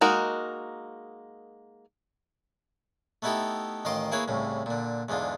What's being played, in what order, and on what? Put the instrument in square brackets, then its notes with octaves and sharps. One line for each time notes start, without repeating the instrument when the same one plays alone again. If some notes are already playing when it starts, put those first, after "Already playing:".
[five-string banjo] G#3 A#3 D#4 F#4 A#4
[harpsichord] A3 B3 D#4 E4 G4 A4
A1 D#3 D#5 F5 C6 D6
A#3 E4 G#4 B4 C#5
C2 A2 C#3
A#2 D3
E2 G#2 D3 F4